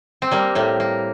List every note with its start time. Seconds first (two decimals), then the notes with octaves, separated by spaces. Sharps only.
0.22 C4
0.31 G3 A#3
0.55 A2 A#3
0.80 A#3